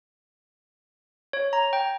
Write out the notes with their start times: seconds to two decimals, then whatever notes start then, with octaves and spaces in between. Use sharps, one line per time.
1.33 C#5
1.53 A#5
1.73 G5